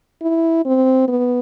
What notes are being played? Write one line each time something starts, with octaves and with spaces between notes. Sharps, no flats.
E4
C4
B3